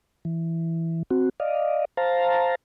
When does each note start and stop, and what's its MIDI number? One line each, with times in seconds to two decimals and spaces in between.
0.25 1.03 52
1.11 1.29 60
1.11 1.29 66
1.40 1.85 74
1.40 1.85 75
1.40 1.85 77
1.97 2.55 72
1.97 2.55 77
1.97 2.55 81
1.97 2.55 82